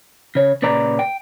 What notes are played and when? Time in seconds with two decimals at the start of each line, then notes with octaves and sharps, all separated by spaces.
0.35 C#3 C#5
0.62 A#2 C#3 B4 D5 A#5
0.99 G5